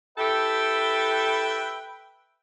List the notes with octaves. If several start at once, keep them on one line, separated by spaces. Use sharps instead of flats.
E4 G4 A4 B4 E5 G5